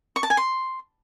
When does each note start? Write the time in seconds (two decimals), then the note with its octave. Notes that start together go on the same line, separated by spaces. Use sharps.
0.16 C#6
0.23 A5
0.30 G#5
0.37 C6